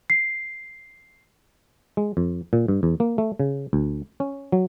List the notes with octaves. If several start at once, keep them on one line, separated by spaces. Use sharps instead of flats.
C7
G#3
F2
A#2
G2
E2
A#3
A3
C#3
D2
C#4
F#3